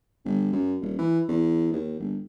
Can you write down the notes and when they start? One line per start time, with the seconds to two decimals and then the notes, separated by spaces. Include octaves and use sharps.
0.25 G1
0.52 F#2
0.81 D#1
0.99 E3
1.28 E2
1.73 D#2
2.00 G1